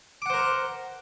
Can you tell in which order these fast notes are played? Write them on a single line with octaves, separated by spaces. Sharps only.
D6 F#5 C5 A#4